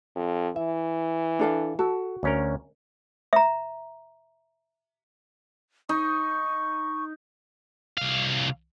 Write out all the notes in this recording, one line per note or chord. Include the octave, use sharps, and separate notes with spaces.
F2
E3 E5
D4 A4 F5
F#4 A4
D2 C#4 A#4
E5 A#5
D#4 C#6
C2 F5